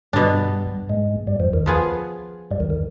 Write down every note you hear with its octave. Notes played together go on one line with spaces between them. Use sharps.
G2 B2 G3 B3 D4
G#2 G#3
G2 G3
F2 F3
D#2 D#3
F3 B3 F4 G#4
G2 G3
D#2 D#3
D#3